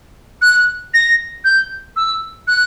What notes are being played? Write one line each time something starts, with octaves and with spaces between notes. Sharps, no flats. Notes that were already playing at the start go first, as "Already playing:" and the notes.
F#6
A#6
G6
E6
F#6